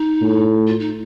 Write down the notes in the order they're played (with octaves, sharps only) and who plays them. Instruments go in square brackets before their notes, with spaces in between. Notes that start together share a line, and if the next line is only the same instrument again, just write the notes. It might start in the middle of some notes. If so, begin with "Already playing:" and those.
Already playing: [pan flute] D#4
[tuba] A2
[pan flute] F4
D#4